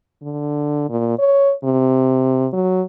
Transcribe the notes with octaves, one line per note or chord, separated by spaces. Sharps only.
D3
A#2
C#5
C3
F#3